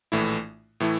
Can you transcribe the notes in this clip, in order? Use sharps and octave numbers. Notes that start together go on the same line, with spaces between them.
A#1 A2 E3 A3 E4
A2 E3 A3 E4